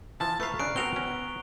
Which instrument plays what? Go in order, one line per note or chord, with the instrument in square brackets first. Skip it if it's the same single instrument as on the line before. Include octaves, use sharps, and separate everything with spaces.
[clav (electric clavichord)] E3 F3 [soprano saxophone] A5
[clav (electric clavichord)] A3 F5 [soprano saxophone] B4 [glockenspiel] A#5 C#6
[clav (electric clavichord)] C#3 [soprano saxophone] D4 [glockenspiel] F#6 C7 D7
[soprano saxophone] B3 [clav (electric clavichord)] C4 F#4 A#4 [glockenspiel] F7 G7
[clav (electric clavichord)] C#4